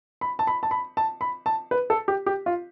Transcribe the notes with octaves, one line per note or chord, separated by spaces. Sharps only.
B5
A5
B5
A5
B5
A5
B5
A5
B4
A4
G4
G4
F4